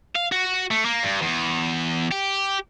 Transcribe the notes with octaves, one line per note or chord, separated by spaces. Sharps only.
F5
F#4
A3
A#3
G2
E2
G4